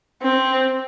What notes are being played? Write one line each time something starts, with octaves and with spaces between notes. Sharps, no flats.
C4